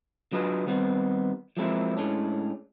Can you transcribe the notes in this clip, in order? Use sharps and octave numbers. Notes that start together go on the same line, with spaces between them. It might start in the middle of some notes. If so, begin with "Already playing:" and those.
F#3 D4 F4 G#4 B4 D#5
D#3 G3 B3 C4 D#4
F3 F#3 G#3 A#3 C4 E4
A2 G#3 C#4 D4